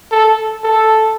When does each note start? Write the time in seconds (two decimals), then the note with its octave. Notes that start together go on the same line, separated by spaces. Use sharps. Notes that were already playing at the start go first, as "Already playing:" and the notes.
0.11 A4
0.64 A4